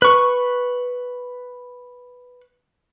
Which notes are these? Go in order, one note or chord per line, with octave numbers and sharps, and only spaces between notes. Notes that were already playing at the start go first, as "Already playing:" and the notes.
B4 C#6